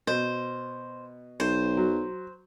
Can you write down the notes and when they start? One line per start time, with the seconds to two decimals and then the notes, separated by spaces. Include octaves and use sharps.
0.07 B2 C5
1.40 B1 C5
1.77 F#3